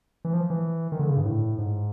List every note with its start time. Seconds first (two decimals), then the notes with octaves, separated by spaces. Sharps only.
0.25 E3
0.33 F3
0.50 E3
0.92 D#3
0.99 D3
1.09 C#3
1.17 G2
1.25 A2
1.58 G#2